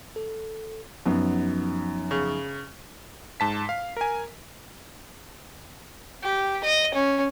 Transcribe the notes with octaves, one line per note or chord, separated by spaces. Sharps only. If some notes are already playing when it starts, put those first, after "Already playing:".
A4
F#2 F3 B3 C#4 D#4
C#3
G#2 A5 B6
F5
A#4 G#5
G4
D#5
C#4